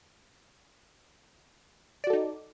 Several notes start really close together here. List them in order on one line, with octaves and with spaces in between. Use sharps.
D5 F#4 A4 D#4